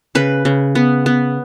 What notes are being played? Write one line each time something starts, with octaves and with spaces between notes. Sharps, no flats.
C#3 B4
C#3
B3
B3